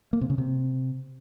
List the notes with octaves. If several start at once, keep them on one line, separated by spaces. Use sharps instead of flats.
A#3
C3
C#3
C3